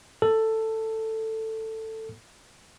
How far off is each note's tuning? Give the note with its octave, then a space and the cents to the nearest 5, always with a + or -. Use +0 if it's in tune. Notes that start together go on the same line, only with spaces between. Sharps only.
A4 +10